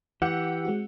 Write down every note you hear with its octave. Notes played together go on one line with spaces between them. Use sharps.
E3 G4 F#5 D6 E6 G6
G#3 C4 F#4